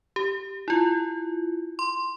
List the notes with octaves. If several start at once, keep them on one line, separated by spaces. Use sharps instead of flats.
G4
E4 F4
C6